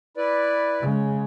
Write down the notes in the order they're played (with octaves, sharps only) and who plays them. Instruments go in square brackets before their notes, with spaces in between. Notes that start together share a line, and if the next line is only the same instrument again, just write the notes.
[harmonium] E4 B4 D5
[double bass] C#3 G#3